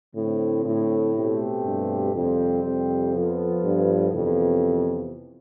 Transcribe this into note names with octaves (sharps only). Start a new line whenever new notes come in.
A2 D3 A3 C4
A2
B2 A3 C4 G4
G2
F2 C3 G3 C4
F2
F3 B3 F4 A4
G2
F2 C3 E3 B3